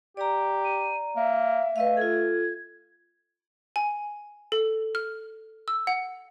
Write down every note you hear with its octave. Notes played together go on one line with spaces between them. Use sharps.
G4 D5 A#5
D#7
A#3 E5
A3 B4 D#5 F5
F4 A4 G#6
G#5
A4
F6
E6
F#5